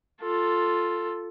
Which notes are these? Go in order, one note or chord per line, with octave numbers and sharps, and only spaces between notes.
F4 A4